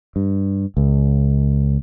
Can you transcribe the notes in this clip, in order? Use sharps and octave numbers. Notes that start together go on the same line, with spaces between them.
G2
C#2